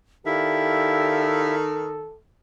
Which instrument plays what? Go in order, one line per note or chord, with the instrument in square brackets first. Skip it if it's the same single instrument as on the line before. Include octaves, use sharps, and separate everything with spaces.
[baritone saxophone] D#3 [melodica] E4 E5 [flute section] G4 D5 F5 [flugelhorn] A4